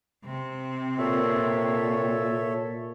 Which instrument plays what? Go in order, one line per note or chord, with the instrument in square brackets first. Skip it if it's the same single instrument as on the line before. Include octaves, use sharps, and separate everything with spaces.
[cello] C3 C4
[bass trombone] A#2 [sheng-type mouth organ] A4 C#5 E5